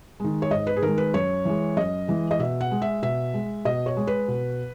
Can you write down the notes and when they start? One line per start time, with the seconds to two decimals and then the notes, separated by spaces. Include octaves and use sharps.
0.20 D#3 G#3
0.42 C#5
0.51 G#2 D#5
0.67 B4
0.76 G#4
0.82 D#3 G#3 A#4
0.98 B4
1.14 F#2 C#5
1.45 E3 G#3
1.77 F#2 D#5
2.08 E3 G#3
2.31 D#5
2.39 B2 E5
2.61 F#5
2.71 G#3
2.82 E5
3.02 B2 E5
3.34 G#3
3.65 B2 D#5
3.86 C#5
3.97 G#3
4.07 B4
4.28 B2